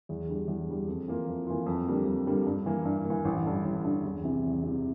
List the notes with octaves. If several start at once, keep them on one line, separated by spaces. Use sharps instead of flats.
E2
D3 G3
E2
D3 G3
F2
E3 A#3 F4
F2
E3 A#3 F4
F2
D3 G3 A#3
F2
D3 G3 A#3
G2
E3 A#3
G2
A#3
E3
A1
G2 D3
A1
G2 D3
E2
C3 E3
E2
C3 E3